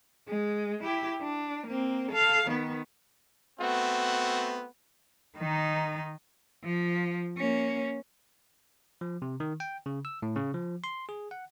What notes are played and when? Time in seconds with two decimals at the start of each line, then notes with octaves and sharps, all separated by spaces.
0.28 G#3
0.83 E4 G4
1.22 D4
1.67 A#3 C4
2.12 A4 F5
2.48 D#3 B3
3.60 A3 B3 C4 F#4
5.38 D#3 D#4
6.63 F3
7.37 A#3 C#4
9.01 F3
9.22 C3
9.40 D#3
9.60 G5
9.86 C#3
10.05 E6
10.22 A2
10.36 C#3
10.54 F3
10.84 C6
11.09 G#4
11.31 F#5